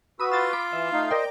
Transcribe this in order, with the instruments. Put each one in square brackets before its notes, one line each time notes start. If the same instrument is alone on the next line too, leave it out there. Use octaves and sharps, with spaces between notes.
[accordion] F#4 B4 [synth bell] B5 D#6 [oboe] E6
[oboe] F4 [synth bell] E6 A6
[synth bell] B5 D6
[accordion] E3 [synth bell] E5
[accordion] A3 D#4 F5
[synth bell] A#4 D5 G5 [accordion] C5 D#5